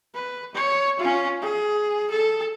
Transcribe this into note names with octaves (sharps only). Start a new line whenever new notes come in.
B4
C#5
C#4 F4
G#4
A4